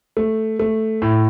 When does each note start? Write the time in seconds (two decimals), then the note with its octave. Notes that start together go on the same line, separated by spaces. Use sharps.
0.17 A3
0.59 A3
1.02 A2